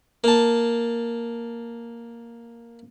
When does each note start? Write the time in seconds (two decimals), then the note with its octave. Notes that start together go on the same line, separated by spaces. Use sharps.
0.24 A#3 A5